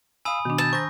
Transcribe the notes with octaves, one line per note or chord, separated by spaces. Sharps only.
F5 G#5 B5 D#6 E6
B2 D#3 D4
A5 E6 G6
C5 A#5 B5 C#6 G6 A#6